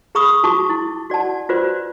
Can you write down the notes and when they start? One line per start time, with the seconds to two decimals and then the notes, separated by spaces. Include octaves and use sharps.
0.15 G#4 A#5 B5 C#6 D#6
0.44 F4 F#4 A5 C#6 D6
0.70 E4
1.10 F#4 D5 F#5 A5
1.49 F4 F#4 B4 C5 D5